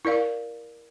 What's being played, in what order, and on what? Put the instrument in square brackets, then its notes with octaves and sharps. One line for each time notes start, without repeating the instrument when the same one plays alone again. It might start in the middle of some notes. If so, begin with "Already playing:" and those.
[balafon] E4 A#4 D5 F5